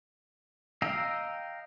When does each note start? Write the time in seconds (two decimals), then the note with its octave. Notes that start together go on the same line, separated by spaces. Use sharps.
0.82 D#5 F5 G5 A#5 E6